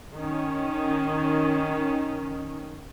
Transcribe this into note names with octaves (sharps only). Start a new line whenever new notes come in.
D#3 C#4